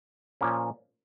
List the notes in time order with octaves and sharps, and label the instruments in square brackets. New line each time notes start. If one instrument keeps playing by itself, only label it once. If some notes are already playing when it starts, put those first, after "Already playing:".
[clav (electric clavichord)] A#2 F3 A#3 C#4